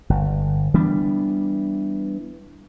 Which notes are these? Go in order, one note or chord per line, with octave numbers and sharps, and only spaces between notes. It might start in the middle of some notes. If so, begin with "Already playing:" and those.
G1
E3 G3 B3 D4